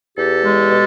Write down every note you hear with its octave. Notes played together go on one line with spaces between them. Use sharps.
E2 G4 A4
G#3
B2